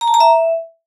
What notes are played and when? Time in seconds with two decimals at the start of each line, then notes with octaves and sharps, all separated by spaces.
0.01 A#5
0.08 A5
0.14 A#5
0.20 E5